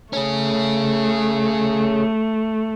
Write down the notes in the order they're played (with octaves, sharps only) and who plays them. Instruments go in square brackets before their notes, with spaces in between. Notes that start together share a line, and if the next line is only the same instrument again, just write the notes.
[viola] A3 [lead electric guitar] C#4 G#4